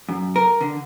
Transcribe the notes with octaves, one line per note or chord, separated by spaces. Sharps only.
F#2
A#4
D3